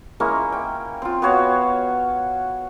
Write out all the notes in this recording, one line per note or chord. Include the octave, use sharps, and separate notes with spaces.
G#3 A#3 C#4 E4
G5
C4 F4
B3 F#4 C#5 F5